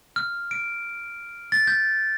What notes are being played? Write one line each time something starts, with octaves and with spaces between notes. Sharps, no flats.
F6
D7
A6
G6